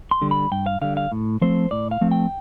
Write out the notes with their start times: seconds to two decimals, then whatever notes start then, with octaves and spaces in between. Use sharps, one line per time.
0.11 C6
0.22 D3 G3
0.31 B5
0.52 G2 G5
0.66 F5
0.81 D3 G3 F5
0.97 F5
1.12 A2
1.41 F3 A3 C4 C5
1.71 A2 D5
1.91 F5
2.01 F3 A3 C4
2.11 G5